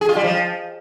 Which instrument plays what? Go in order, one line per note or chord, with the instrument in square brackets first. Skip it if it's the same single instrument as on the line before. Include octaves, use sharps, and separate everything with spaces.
[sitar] G#4
F4
G3
F3